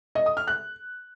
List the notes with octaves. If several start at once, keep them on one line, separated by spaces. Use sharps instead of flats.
D#5
D#6
F6
F#6